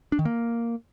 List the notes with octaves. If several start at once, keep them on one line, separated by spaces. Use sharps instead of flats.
D4
D#3
A#3